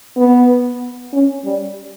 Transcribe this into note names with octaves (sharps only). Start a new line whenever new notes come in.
B3
C#4
G3